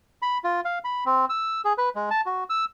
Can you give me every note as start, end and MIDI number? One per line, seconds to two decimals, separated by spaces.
0.22 0.38 83
0.44 0.60 65
0.65 0.79 77
0.84 1.04 83
1.06 1.25 60
1.29 1.61 88
1.64 1.73 68
1.78 1.89 71
1.95 2.09 56
2.11 2.21 81
2.26 2.44 66
2.50 2.65 88